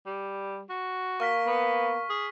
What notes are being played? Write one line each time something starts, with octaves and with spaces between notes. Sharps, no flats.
G3
F#4
A#3 C#6 F6 B6
B3
G#4